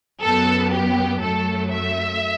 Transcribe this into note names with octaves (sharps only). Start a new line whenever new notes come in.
F#2 F#3 B3 A4
G4
F#2 F#3 A3 A4
E5